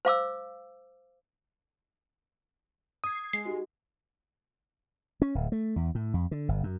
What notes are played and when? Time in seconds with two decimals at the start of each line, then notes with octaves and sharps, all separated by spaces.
0.05 C5 F5 D6 E6
3.04 D#6 G#6 C7
3.33 G#3 C7
3.45 D#4 F#4 G4
5.22 C#4
5.35 D1
5.52 A3
5.76 E2
5.95 A2
6.14 F2
6.31 D3
6.49 G1
6.63 F#2